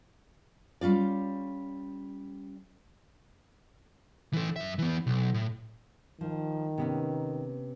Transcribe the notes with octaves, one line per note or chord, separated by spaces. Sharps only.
G3 C#4 F4 D5
E3 A4
F#2 E5
E3 B3
B1
A2
D#3 F3
C3 B3 C#4